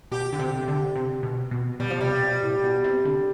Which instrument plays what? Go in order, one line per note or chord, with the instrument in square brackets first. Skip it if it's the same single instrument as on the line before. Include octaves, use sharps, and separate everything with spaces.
[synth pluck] B2 [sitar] G4
[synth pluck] D3
C3
C3
D3
C3
B2
B2
[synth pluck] B2 [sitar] G3
[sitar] F3
[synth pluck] C3 [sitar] G3
[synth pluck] B2
A2
B2
C3
D3